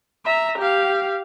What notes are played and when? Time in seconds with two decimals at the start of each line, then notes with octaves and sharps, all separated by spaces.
0.25 E5 A#5
0.58 G4 F5